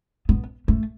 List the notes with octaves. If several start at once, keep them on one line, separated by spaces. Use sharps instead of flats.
B3
A3